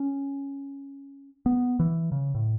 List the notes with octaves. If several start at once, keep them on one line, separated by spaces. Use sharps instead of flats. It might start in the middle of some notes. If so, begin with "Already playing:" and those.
Already playing: C#4
B3
E3
C#3
A2